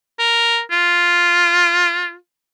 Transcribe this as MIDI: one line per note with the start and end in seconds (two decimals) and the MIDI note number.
0.19 0.60 70
0.71 2.15 65